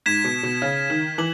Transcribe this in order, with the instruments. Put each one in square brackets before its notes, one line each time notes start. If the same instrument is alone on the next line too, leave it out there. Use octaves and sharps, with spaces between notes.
[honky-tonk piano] G#2 [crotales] G#6 B6 E7
[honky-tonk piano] B2
B2
C#3
D#3
[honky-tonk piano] E3 [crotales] F#7